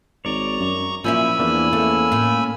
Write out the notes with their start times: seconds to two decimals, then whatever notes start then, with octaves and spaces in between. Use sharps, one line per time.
0.25 G#1 C#5 D5 A#5 C#6
0.60 F#2
1.04 A#2 F3 C#4 E4 G#5 B5 E6
1.39 E2 A#3 D4
1.73 A3 A#3 C#4 A4
2.12 A2 F4